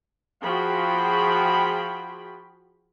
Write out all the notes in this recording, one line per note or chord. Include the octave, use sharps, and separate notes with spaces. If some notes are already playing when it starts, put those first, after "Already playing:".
F3 F4 F#4 G#4 G5 B5